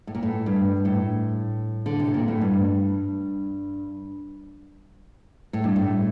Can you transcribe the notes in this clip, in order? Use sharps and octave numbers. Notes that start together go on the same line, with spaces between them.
A2
A#2
A2
G2
A2
D3
C3
A#2
A2
G2
A2
G2
A2